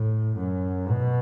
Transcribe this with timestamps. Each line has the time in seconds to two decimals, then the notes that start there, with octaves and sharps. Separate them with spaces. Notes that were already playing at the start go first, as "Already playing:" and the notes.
Already playing: A2
0.36 F#2
0.89 B2